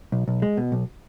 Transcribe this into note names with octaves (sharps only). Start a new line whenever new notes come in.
B1
B1
G#3
B2
B1